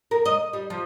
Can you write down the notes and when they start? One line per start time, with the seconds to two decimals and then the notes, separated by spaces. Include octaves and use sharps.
0.11 A#4
0.26 D#5
0.53 G3
0.70 F3